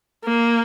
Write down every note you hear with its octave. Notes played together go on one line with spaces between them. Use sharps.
A#3